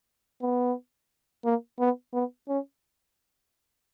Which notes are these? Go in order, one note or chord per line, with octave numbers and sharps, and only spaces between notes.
B3
A#3
B3
B3
C#4